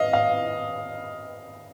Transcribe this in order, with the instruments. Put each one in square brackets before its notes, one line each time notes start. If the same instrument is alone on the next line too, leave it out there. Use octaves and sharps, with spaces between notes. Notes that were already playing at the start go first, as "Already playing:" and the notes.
Already playing: [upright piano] D#5 F5
F5